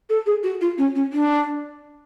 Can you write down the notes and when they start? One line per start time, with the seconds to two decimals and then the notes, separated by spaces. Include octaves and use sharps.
0.09 A4
0.26 G#4
0.43 F#4
0.61 F4
0.77 C#4
0.95 C#4
1.12 D4